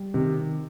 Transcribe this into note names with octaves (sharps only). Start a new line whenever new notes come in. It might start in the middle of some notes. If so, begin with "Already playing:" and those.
Already playing: G3
C3 D#3